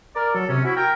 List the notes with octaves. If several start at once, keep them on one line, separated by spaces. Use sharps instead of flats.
A#4 D5
F#3 A4
C3 C#4
E4 F#4
A#4 G5